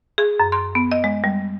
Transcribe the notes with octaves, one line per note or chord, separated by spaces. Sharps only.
G#4
F#2
C6
B3
D#5
G#3
G3